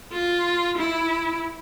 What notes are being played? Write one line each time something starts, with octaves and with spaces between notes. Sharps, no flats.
F4
E4